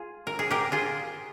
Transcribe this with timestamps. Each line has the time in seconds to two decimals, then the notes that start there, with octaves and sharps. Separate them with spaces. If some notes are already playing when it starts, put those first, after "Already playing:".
Already playing: F4 G#4
0.27 A#4
0.39 G#4
0.51 G4 A#4
0.72 F4 G#4